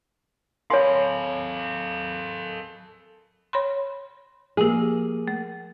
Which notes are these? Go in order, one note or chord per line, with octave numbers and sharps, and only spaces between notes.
A4 A#4 C#5 F5 G#5 B5 C6
C#5 B5 C6
F3 A#3 G4 G#4
A3